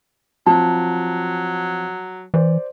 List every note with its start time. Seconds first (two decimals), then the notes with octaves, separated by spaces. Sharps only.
0.46 F3 F#3 C4 A5
2.34 E3 C5 D5